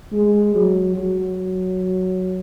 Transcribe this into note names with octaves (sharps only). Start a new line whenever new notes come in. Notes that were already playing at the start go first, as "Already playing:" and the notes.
G#3
F#3
F#3